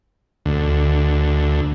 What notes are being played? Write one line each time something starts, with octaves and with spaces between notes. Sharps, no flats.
D2